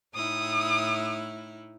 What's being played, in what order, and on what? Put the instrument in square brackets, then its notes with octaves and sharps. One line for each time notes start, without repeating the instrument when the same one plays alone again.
[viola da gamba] A2 D#4 E4 [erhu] D#6